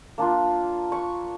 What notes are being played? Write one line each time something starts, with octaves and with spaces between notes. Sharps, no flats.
A#3 D4 F4
C#6